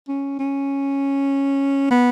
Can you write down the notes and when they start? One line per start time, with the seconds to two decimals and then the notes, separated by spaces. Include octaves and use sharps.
0.08 C#4
0.39 C#4
1.90 B3